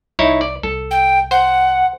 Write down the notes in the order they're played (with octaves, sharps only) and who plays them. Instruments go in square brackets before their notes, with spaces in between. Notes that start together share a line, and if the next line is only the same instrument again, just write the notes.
[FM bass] C2 [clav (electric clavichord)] D#4 E4 C#5
[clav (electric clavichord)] D5
[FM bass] C2 [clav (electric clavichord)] A4
[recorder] G5
[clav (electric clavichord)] C5 [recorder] F#5